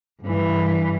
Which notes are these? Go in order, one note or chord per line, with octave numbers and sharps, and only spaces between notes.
G2 E3